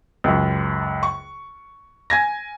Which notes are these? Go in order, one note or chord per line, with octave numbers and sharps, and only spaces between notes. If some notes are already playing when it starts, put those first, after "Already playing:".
C#2 F#2
C#6
G#5 G#6 A#6